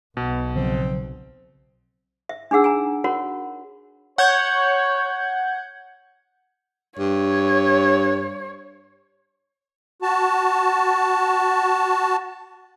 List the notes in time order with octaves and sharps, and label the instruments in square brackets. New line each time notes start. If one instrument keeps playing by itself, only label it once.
[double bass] B1 [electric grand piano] B2 [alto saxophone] B3
[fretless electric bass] C#3 F3 F#3 [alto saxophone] C4
[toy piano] E5
D4 D#4 G#4 F#5 E6
G#5 A#5
F#4 A#4 C#5 F#5 B5
[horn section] C#5 [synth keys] F#5 G6 G#6
[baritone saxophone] G2 [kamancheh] C#5
[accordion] F#4 A5